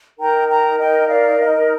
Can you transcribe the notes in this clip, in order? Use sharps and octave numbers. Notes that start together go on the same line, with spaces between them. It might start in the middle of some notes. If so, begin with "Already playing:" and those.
D#4 A#4 G5 A#5
G5 A#5
D#5 G5
D5 F5
D#5